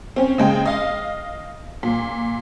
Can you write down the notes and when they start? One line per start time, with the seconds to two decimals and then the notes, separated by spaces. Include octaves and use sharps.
0.16 C4 C#4
0.38 C#3 G#3 G5
0.66 D#5 F5
1.83 A#2